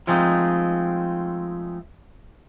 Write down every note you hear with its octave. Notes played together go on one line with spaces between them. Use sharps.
F3 G#3 A3 C4 D#4